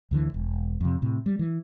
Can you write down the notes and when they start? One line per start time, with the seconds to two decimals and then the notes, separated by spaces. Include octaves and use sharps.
0.11 D2 D3 E3
0.34 E1
0.81 F2 C3
1.02 A2 C3
1.26 G3
1.39 E3